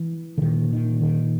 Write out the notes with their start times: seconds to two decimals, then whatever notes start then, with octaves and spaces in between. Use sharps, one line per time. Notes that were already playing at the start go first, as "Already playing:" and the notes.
Already playing: E3
0.38 D3
0.42 A#2 D#3
0.73 D#3
1.01 D#3